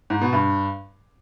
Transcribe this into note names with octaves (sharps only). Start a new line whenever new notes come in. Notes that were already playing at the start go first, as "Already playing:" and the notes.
G#2
B2
G2